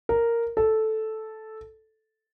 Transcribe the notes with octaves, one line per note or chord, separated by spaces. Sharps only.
A#4
A4